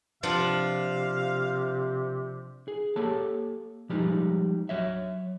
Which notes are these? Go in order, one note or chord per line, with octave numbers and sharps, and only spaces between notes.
C3 F3 D4 F5 F#5
G#4
A#3 G4 A4 C#5 A5
F3 G3 G#3 A#3 D#4
F#3 C#5 E5